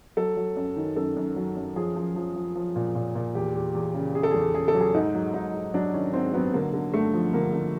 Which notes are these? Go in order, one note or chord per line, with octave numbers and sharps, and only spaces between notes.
F#3 A4
F#3
F#2
D#3
F#2 A4
F#2
F#3
F#2
F3 G#4
F3
F3
F3
F3
A#2
A#2
A#2
E2 G4
E2
E2
C#3
C#3 G#4
A4
E2 G#4
C#3 G#4
A4
F#3
G#4
G#2 D#4
F#3
G#2 D#4
G#2
F#3 D4
D#3 C#4
G#2 C4
F#3 B3
D3 A#3
D3
G2 A3
F3
D3 A#3
D3